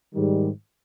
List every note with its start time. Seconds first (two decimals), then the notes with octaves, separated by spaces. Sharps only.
0.14 G#2 D#3 G3